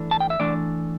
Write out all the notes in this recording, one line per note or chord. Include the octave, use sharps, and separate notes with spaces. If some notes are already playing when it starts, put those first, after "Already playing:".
Already playing: E3 A3 D4
A5
G5
E5
E3 A3 D4 D5